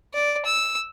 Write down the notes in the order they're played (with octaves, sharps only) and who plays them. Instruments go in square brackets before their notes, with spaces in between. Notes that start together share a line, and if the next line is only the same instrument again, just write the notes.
[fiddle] D5
E6